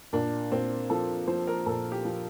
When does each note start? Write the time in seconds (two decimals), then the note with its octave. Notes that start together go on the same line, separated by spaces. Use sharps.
0.13 A#2 D4
0.51 A#2 C4
0.90 F3 A4
1.28 F3 C5
1.47 A#4
1.66 A#2 A4
1.92 G4
2.05 F3